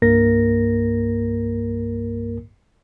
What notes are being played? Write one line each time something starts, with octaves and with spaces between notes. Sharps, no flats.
C2 G2 A#3 A#4 A#6